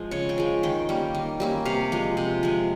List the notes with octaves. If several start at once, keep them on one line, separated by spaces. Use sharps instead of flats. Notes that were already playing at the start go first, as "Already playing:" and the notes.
Already playing: F3 G#3
C#3 C#5
G5
F3 G#3
D#3 G5
G3 A#3 C#4
D#3
G3 A#3 C#4
C3 F5
F3 G#3
C3
F3 G#3